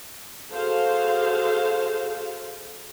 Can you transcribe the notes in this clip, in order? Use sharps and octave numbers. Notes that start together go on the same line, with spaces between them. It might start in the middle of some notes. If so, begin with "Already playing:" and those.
F#4 G#4 A4 C5 F5